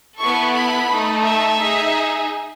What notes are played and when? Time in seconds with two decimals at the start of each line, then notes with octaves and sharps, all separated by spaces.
0.19 B3 E4 A4 C#6
0.54 B5
0.90 A3 D#4 A4
1.25 E5
1.59 D#4 G#4